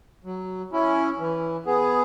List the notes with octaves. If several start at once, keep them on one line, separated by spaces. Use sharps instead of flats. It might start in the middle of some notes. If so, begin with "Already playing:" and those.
F#3
C#4 E4
E3
B3 G#4